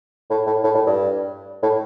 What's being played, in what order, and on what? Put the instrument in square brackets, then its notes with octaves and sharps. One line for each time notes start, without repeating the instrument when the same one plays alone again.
[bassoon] A2
A2
A2
A2
G2
A2